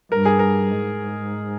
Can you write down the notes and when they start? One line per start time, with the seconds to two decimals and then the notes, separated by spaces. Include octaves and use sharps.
0.12 G2 A#4
0.25 G#4
0.39 A#4
0.71 G#2